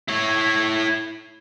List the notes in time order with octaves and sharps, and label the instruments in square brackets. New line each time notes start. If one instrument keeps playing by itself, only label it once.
[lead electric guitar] E4 C#5